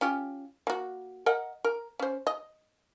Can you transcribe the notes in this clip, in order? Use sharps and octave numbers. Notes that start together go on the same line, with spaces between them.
C#4 F4 G4
A#3 F#4
A#4 D#5 F#5
A#4
C#4 C5
D#5